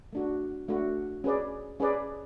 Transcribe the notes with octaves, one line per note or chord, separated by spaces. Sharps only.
A3 D4 F#4
A3 D4 F#4
C#4 G#4 B4 D5
C#4 G#4 B4 D5